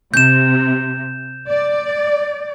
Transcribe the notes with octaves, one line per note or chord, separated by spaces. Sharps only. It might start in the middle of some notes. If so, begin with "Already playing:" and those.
C3 G6 E7
D5